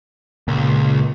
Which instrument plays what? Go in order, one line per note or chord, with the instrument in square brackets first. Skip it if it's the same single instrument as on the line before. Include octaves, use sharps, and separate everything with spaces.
[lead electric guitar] C#2 [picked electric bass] A#2